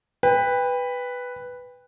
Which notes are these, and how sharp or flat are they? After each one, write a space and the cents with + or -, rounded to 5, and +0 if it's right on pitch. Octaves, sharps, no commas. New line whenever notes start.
B4 +0 G5 +30